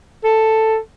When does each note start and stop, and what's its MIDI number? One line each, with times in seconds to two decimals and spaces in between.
0.24 0.77 69